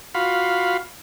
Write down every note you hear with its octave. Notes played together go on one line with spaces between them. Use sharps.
F4 F#4 F5 B5